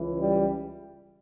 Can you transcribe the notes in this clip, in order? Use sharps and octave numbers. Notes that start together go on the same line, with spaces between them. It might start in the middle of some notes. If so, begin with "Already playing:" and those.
Already playing: C#2 C#3 E3
G3